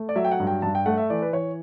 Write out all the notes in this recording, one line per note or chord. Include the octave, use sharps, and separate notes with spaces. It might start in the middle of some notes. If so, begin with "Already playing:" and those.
Already playing: A3
D5
F#3 E5
G5
F#5
G2
G5
G2 A5
G5
A3 F#5
E5
E3 D5
B4
E3 C#5